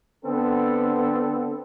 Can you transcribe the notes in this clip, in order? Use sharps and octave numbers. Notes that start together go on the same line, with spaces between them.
D3 B3 C4 A4